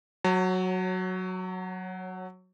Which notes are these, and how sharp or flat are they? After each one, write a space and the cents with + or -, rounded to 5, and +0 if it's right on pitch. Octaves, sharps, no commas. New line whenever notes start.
F#3 +0 C#5 -15 A#5 -45